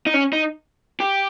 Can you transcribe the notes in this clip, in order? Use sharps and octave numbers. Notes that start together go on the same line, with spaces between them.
D#4
C#4
D#4
G4